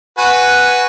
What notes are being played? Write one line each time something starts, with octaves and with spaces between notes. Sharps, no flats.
F#4 B4 G#5